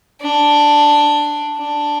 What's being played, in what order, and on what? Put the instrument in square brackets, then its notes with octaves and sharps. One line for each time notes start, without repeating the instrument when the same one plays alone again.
[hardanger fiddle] D4
D4